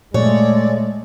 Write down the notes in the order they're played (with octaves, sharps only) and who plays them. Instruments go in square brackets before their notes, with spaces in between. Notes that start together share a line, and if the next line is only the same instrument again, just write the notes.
[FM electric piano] A#2 [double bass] G#3 A3 [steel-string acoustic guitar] C#5 [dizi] D5